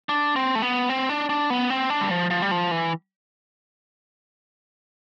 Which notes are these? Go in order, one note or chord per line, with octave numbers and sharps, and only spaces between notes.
D4
C4
A3
B3
C4
D4
D4
B3
C4
D4
G3
F3
F3
G3
F3
E3